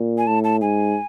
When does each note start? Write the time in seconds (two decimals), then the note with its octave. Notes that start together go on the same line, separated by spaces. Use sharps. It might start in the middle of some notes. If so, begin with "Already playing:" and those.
Already playing: A#2
0.18 G#5
0.27 A2 A5
0.44 A5
0.61 G#2 G#5